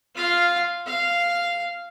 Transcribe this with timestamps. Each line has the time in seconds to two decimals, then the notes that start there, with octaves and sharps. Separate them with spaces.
0.15 F4 F5
0.86 F5